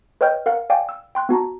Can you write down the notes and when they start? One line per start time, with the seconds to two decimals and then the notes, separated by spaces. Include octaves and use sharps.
0.21 B4 C#5 D#5 G5 F6 G6
0.46 A#4 F5 F#5 F6
0.70 D5 F5 G5 G#5 D6
0.89 E6
1.15 G5 C6 F#6
1.29 B3 F#4 A5 A#5